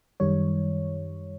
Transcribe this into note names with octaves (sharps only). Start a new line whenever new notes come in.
F#2 D#3 G3 C#5